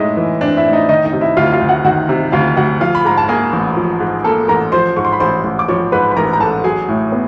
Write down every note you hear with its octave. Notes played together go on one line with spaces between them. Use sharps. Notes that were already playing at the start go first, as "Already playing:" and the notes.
Already playing: A2 G#3 D#4 D#5 E5
E3
C4 D4 D5
E4 E5
A2
D#4 D#5
D#3 D#4 D#5
D#4 D#5
C3
E4 E5
D2 F4 F5
F4 F5
D2
F#4 F#5
D#3 F#4 F#5
C3
D2 F4 F5
D2 F#4 F#5
F3 F4 F5
B5
G#2 A#5
A5
A#3 G#4 G#5
A1
F3
G#2
A#3 A4 A5
A1 A#4 A#5
F3 C5 C6
G#2 C#6
C6
B5
A1 C5 C6
A1
D6
F3 C#5 C#6
G#2 B4 B5
B5
A1 A#4 A#5
A#5
A1 A4 A5
F#3 G#4 G#5
A2
B3